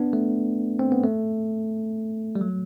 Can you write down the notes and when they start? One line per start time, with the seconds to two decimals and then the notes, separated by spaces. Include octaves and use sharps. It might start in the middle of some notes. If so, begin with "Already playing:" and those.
Already playing: B3 D4
0.13 A3
0.79 C4
0.92 B3
1.03 A3
2.35 G3
2.41 F#3